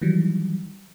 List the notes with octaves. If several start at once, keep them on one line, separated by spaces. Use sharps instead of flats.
D#3 E3 F#3 G3